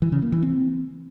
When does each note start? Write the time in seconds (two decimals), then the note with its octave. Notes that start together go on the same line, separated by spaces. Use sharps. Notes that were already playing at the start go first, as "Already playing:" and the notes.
0.02 E3
0.12 C#3
0.22 A#3
0.32 E3
0.42 C4